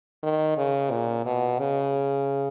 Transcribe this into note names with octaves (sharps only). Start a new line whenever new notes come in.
D#3
C#3
A#2
B2
C#3